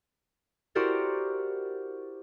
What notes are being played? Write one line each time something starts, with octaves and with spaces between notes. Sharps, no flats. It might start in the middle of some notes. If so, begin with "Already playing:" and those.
E4 F#4 G4 A#4 C5 D5